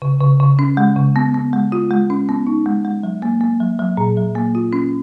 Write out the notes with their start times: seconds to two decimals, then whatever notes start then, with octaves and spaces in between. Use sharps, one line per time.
0.02 C#3
0.21 C#3
0.40 C#3
0.59 C#4
0.77 G#3
0.96 C#3
1.16 B3
1.34 B3
1.53 G#3
1.72 F4
1.91 G#3
2.10 C#4
2.29 B3
2.47 D#4
2.66 G#3
2.85 G#3
3.03 F#3
3.22 A#3
3.41 A#3
3.60 F#3
3.79 F#3
3.97 A#2
4.17 F#3
4.35 A#3
4.55 F4
4.73 C#4